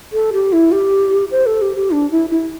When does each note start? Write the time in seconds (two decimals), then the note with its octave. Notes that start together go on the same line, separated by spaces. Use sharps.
0.13 A4
0.33 G4
0.53 E4
0.72 G4
1.31 C5
1.46 A4
1.62 G4
1.77 G4
1.91 D4
2.11 E4
2.30 E4